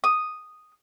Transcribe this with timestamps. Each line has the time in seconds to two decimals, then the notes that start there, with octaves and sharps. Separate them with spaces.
0.04 D#6